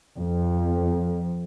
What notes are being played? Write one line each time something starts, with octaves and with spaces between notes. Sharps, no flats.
F2